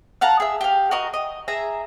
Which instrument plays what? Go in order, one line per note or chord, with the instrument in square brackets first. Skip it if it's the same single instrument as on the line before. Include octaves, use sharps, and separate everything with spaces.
[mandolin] F5 F#5 A5 A#5
G#4 E5
G4 F5
F#4 A#4 D#5
D#5
G#4 E5 A#5